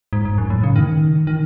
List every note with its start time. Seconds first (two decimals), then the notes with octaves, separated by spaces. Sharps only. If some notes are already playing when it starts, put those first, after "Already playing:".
0.13 G#2
0.25 G#2
0.38 F#2
0.50 A2
0.64 C#3
0.76 D#3
1.27 D#3